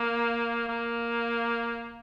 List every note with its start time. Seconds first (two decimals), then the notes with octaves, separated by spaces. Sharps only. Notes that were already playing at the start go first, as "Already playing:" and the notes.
Already playing: A#3
0.68 A#3